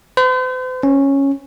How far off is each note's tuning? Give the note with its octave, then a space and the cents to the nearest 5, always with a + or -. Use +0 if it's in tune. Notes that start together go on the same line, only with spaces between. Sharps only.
C5 -45
C#4 -10